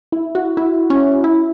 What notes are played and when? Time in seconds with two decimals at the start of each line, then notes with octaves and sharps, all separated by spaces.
0.12 E4
0.35 F#4
0.57 E4
0.90 C#4
1.24 E4